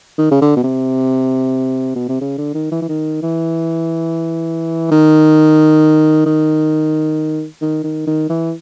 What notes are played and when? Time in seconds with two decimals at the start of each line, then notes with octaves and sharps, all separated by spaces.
0.18 D#3
0.31 C#3
0.41 D3
0.56 B2
0.63 C3
1.95 B2
2.08 C3
2.21 C#3
2.38 D3
2.54 D#3
2.71 E3
2.81 E3
2.89 D#3
3.22 E3
4.91 D#3
6.26 D#3
7.61 D#3
7.84 D#3
8.07 D#3
8.29 E3